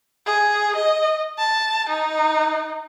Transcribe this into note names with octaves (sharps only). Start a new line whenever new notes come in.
G#4
D#5
A5
D#4